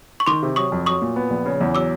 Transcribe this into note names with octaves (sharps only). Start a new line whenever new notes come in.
C#6
D#3 C6 D6
C3
F#3 C#6 D#6
F2
F#3 C#6 D#6
A#2
B3
A#1
C#3
E2
F#3 D6 E6